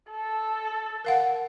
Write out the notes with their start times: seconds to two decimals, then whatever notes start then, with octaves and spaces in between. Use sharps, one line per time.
0.11 A4
1.05 A#4 F5 F#5